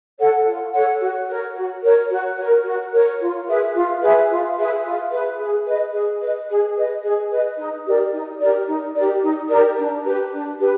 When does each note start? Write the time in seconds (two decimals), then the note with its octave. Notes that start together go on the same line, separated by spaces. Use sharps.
0.19 A4 C#5 F#5
0.46 F4
0.73 A4 C#5 F#5
1.01 F#4
1.29 A#4 C#5
1.56 F#4
1.83 A#4 C#5
2.10 F#4
2.37 A#4 C#5
2.64 F#4
2.93 A#4 C#5
3.20 F4
3.48 G#4 B4 E5
3.75 F4
4.02 G#4 B4 E5
4.30 F4
4.57 G#4 B4 E5
4.84 F4
5.11 G#4 B4 E5
5.40 G#4
5.66 B4 D#5
5.93 G#4
6.21 B4 D#5
6.49 G#4
6.76 B4 D#5
7.03 G#4
7.30 B4 D#5
7.58 D#4
7.86 G4 A#4 D5
8.12 D#4
8.40 G4 A#4 D5
8.67 D#4
8.95 G4 A#4 D5
9.22 D#4
9.50 G4 A#4 D5
9.77 D4
10.05 G4 B4
10.32 D4
10.59 G4 B4